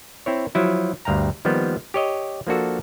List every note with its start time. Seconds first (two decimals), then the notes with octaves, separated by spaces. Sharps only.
0.26 C4 E4 C#5
0.55 F3 F#3 E4
1.05 D2 G2 F5 G5 A#5
1.45 D#3 F3 G3 A#3 B3
1.94 G4 C#5 D#5
2.47 F3 A#3 D4 F#4 A4